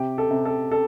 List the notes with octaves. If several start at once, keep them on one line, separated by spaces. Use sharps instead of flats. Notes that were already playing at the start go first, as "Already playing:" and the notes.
Already playing: C3 G4
A4
C3
A4
A4